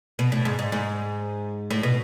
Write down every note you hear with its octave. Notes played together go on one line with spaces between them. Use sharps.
B2
A2
G#2
G#2
G#2
A2
B2